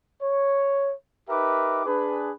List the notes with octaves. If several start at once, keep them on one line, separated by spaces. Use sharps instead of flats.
C#5
D#4 G4 A#4 B4 E5 D6
D4 G#4 B4